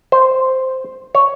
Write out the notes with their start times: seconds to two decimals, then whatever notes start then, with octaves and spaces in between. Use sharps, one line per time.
0.12 C5
1.15 C#5